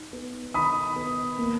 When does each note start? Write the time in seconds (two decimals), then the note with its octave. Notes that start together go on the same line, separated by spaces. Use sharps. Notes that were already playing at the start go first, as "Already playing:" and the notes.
Already playing: D#4
0.13 B3
0.54 D#3 B5 D#6
0.96 B3
1.38 A#3